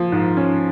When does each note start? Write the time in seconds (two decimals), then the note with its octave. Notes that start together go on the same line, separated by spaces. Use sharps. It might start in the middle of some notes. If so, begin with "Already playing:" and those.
Already playing: F3 A#3
0.12 G#2
0.37 C#4